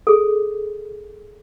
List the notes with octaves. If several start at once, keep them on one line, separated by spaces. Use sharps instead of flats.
G#4 A4